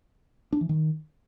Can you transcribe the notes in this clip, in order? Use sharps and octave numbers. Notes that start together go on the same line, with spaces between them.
D4
E3
D#3